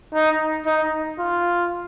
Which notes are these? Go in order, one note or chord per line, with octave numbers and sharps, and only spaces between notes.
D#4
D#4
F4